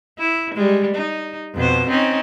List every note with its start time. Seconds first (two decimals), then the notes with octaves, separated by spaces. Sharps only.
0.19 E4
0.54 G3 G#3
0.95 D#4
1.55 F2 B2 C5
1.88 C4 C#4 D#4